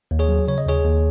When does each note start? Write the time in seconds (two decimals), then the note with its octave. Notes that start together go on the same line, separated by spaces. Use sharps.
0.11 D#2
0.19 G#4 C#5
0.29 F#3
0.48 C#3 C#5
0.58 D#5
0.66 D#2 G#4 C#5
0.85 D#2